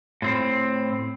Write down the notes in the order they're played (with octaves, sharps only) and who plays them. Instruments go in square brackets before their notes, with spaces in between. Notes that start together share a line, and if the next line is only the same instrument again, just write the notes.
[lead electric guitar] A2 C4